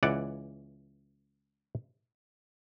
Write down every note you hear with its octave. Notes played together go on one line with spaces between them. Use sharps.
C#2 E3 D5 F#5